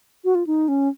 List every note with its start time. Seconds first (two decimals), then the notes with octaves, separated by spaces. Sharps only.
0.25 F#4
0.35 F4
0.47 D#4
0.68 C#4